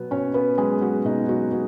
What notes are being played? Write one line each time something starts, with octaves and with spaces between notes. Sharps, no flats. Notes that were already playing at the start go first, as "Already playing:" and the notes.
Already playing: B2 F#3 B3
B2 C#4 C#5
B3 B4
F#3 G#3 G#4
F#3 F#4
B2 D#4
F#3 F#4
F#3 F#4